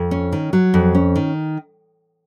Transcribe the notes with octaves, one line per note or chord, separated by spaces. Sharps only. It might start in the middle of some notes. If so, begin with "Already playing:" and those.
Already playing: F2
C#4
D#3
F#3
F2
C#4
D#3